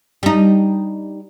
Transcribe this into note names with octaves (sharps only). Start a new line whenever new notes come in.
G3 D#4